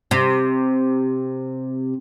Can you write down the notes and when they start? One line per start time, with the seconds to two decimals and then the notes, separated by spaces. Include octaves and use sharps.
0.11 C3